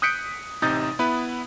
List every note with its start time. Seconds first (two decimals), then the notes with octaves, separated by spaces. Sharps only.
0.02 D#6 F#6 G6 B6 C#7 D7
0.62 A1 C3 D#4 D#6 G6 A6
0.99 B3 E4 B4